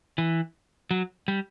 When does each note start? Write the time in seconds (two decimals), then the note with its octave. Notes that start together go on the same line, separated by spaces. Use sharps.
0.18 E3
0.91 F#3
1.28 G3